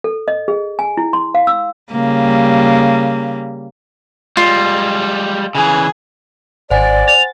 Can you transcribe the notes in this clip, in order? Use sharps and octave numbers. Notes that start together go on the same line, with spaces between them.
A4
D#5
G#4
G#5
E4
C6
F5
E6
C#3 G3 A#3
G3 G#3 F4
C#3 E3 G#4
G#1 C5 D5 F#5 G#5
A6 F7